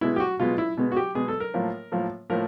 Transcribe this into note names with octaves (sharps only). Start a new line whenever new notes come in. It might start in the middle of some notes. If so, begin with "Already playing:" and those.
B2 G#3 B3 E4
G4
F#4
B2 G#3 B3 F4
E4
B2 G#3 B3
F#4
G4
B2 G#3 B3 G#4
A4
A#4
A2 F3 A#3
A2 F3 A#3
A2 F3 A#3 A#4